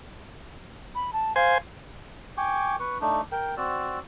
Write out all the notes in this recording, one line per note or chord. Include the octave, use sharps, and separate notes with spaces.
B5
A5
C5 F5 G#5
G5 G#5 C#6 D6
B4 C#6
A3 D4 D#4
A#4 G5
C4 F#4 D5 E6